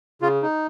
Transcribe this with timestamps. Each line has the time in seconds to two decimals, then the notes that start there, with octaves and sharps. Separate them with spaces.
0.22 C#3 F4
0.42 D#4